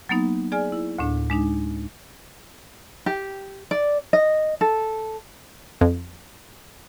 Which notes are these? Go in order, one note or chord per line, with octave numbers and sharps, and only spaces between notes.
F#3 A#3 B3 D#4
G#4 D5 G#5 F6
E4
D2 A2 D4
G#3 D4 D#4
G4
D5
D#5
A4
F2